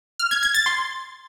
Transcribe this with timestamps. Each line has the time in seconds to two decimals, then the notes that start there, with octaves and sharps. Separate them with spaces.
0.19 F6
0.31 G#6
0.43 G#6
0.54 A6
0.66 C6